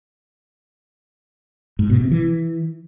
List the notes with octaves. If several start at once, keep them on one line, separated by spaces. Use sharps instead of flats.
G#2
B2
C3
E3